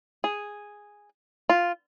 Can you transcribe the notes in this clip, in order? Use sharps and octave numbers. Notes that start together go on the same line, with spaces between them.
G#4
F4